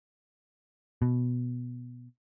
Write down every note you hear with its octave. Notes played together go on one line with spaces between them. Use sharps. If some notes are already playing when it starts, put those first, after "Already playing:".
B2